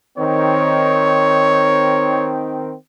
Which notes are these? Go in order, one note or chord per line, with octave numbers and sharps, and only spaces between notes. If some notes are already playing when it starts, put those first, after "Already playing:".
D#3 C4 C#5